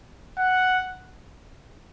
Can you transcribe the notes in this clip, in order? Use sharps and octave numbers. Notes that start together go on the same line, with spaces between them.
F#5